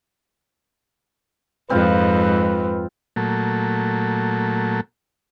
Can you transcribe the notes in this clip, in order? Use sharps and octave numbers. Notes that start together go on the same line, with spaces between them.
F2 G#2 C4 F4 B4
A#2 F#3 A3